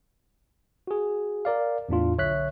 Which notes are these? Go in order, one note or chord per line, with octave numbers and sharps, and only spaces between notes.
F#4 G#4
A#4 D5 F5
E2 A2 D4 F4
B1 D3 C#5 E5 F#6 B6